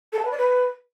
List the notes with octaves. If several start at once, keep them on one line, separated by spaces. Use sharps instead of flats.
A4
A5
B4
D5
B4